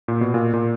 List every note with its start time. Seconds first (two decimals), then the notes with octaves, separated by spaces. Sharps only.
0.08 A#2
0.21 B2
0.34 A#2
0.53 A#2